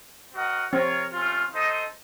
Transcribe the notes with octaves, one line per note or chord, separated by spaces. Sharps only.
C4 F#4 A#4 D#5 F#5
C4 F4 A#4 C#5
A3 C#4 F4
D#4 A4 C5 D#5